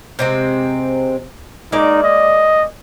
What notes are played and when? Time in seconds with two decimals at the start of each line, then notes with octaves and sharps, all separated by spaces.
0.19 C3 G#3 C4
1.72 G#3 A#3 D#4 D5
2.03 D#5